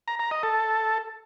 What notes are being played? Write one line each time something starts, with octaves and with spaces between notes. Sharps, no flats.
A#5
A#5
D#5
A4